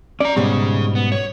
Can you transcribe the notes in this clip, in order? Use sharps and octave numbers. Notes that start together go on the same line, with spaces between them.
C#4 D5 A#5
G#2 B2 G3 C#4 G#4
B3
C#5